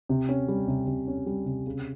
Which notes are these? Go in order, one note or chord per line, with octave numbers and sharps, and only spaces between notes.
C3
C#4
G3
C3
C3
C#4
G3
C3
C#3